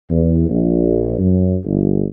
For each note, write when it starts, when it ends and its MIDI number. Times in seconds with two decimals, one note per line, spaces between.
0.10 0.48 40
0.49 1.18 34
1.19 1.57 42
1.65 2.03 31